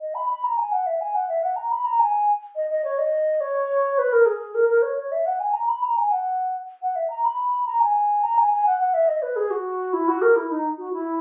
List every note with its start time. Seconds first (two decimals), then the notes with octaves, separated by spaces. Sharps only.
0.01 D#5
0.15 B5
0.29 B5
0.44 A#5
0.57 G#5
0.72 F#5
0.86 E5
1.01 G#5
1.15 F#5
1.29 E5
1.43 F#5
1.56 A#5
1.71 B5
1.85 A#5
2.00 G#5
2.56 D#5
2.70 D#5
2.84 C#5
2.99 D#5
3.41 C#5
3.98 B4
4.13 A#4
4.26 G#4
4.55 A#4
4.69 A#4
4.82 C#5
4.97 C#5
5.12 E5
5.26 F#5
5.40 G#5
5.53 A#5
5.68 B5
5.82 A#5
5.97 G#5
6.11 F#5
6.82 F#5
6.96 E5
7.10 A#5
7.25 B5
7.66 A#5
7.80 G#5
8.23 A#5
8.38 G#5
8.51 G#5
8.66 F#5
8.80 F#5
8.94 E5
9.08 D#5
9.22 B4
9.36 G#4
9.51 F#4
9.93 E4
10.08 F#4
10.22 A#4
10.36 E4
10.51 D#4
10.78 F#4
10.93 E4